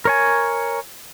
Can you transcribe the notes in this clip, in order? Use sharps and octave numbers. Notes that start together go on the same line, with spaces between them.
A#4 C#5 G#5